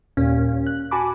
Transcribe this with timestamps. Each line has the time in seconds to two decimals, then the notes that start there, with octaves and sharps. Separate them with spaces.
0.17 D#2 A#2 C#4
0.67 F#6
0.91 F#4 G#5 A5 B5 D6